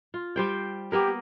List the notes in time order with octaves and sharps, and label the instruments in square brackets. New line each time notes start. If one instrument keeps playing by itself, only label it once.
[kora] F4
G3 C5 G5
[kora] A#3 B3 A#4 [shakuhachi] G4